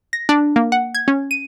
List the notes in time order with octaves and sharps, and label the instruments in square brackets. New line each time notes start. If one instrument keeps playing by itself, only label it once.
[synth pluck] A#6
D4
A#3
F#5
G#6
C#4
D#7